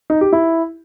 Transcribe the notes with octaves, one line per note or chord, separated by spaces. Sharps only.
D#4
G4
E4